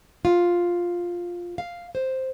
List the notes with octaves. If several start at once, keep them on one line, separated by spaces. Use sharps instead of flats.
F4
F5
C5